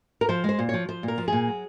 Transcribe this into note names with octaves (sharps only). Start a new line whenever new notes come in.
A#4
F3 C5
G#3
C5
A#2
F3 C#5
F3 C5
A#2
A#4
F3
A#2 G#4
F#3